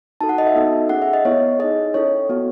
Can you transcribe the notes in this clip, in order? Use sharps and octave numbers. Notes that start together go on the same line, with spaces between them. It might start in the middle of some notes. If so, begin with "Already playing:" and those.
D#4 F#4 A4 A5
F#5
D#5
E5
B3 D#4 F#4 A4
C#4 G#4 F#5
E5
D#5
B3 E4 A4 C#5
D#4 G#4 D#5
C#4 E4 A4 C#5
B3 F#4 A4